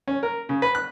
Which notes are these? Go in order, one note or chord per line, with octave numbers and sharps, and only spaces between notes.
C#4
A#4
C#3
B4
F#6